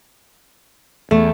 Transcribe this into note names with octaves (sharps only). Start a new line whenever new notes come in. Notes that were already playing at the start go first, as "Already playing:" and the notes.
E2 A3